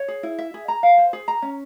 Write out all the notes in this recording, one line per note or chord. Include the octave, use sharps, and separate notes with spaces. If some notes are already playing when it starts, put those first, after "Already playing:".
Already playing: C#5
G#4
E4
E5
G#4
A#5
F5
C5
G#4
A#5
C#4